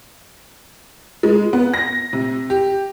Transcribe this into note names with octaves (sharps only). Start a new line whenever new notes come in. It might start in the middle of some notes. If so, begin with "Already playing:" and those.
G#3
B3
A#6
C3
G4